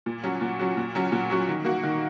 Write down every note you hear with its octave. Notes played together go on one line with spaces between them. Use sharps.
A#2
F#3 C#4 F#4
A#2
F#3 C#4 F#4
A#2
F#3 C#4 F#4
A#2
F#3 C#4 F#4
D#3
A#3 F#4
D#3